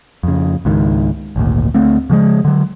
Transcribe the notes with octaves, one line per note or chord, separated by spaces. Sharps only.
F2 C#3
C#2 G#2 D#3
G#1 D2 A#2
D2 A3 C4
C#3 F3 G3 G#3
D3 F#3